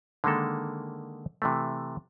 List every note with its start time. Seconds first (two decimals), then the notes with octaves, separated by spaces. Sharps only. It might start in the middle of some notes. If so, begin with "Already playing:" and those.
0.24 D3 D#3 G#3 A#3 A4
1.42 C3 E3 A3